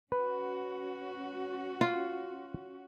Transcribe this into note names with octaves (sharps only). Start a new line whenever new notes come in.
C#4 F#4 B4
F4